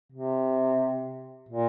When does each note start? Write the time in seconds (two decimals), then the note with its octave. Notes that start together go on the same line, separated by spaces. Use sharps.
0.12 C3
1.49 A#2